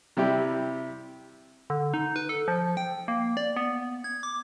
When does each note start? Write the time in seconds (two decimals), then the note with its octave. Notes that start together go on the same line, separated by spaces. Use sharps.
0.17 C3 G3 E4 G4
1.70 D3
1.94 D#4
2.16 B4
2.29 A4
2.48 F3
2.77 G5
3.08 A#3
3.37 D5
3.56 B3
4.04 G#6
4.23 D6